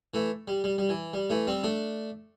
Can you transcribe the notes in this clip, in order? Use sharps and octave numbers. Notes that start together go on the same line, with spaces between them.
E3 A3
G3
G3
G3
E3
G3
E3 A3
G3 C4
A3 D4